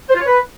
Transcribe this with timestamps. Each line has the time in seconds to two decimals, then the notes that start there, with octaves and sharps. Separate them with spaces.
0.09 C5
0.15 F4
0.21 C#5
0.27 B4